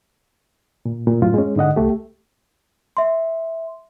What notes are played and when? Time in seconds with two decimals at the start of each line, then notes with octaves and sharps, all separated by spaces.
0.85 A#2
1.07 A#2
1.22 F#2 A2 F4
1.34 G#3 C#4
1.56 G#2 D3 D#5 F#5
1.76 C2 A3 G4
2.97 E5 C6